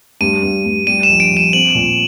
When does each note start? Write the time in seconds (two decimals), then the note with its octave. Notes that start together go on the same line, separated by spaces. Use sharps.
0.21 G2 D#7
0.43 G2
0.65 G2
0.87 G3 D#7
1.03 E7
1.09 A#1
1.20 D7
1.31 A#1
1.37 E7
1.53 C4 F#7
1.75 A#2